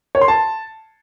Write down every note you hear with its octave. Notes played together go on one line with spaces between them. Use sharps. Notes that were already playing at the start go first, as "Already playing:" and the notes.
C#5
C6
A5